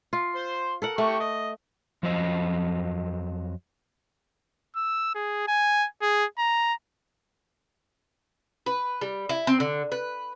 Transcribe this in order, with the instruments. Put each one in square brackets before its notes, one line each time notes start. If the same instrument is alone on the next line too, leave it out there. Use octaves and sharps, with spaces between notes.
[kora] F4
[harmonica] C5 C6
[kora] A4 A#4 F#5
[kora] A3 [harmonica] G4 C#6
[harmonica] D#5
[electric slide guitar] F2 F3 F#3 C5 D#5
[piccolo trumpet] E6
G#4
G#5
G#4
A#5
[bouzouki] B4
G3
E4
C4
D3
B4